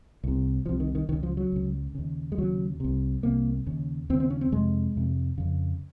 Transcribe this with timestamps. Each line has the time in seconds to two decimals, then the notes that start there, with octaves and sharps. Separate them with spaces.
0.24 C2 C3
0.66 C2 C3 F3
0.80 D#3
0.95 D#3
1.09 C#2 D#3
1.13 C#3
1.23 F3
1.37 F#3
1.52 C#2 C#3
1.95 D#2 C#3
2.32 G#3
2.38 D#2 C#3 F#3
2.80 C2 C3
3.23 C2 C3 A#3
3.66 D#2 C#3
4.10 D#2 C4
4.14 C#3
4.20 C4
4.30 C#4
4.41 C4
4.52 F2 C3 G#3
4.96 F2 C3
5.38 F2 C#3